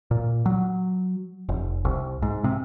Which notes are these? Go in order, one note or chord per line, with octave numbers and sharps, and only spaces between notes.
A#2
F#3
F1
C2
G#2
C3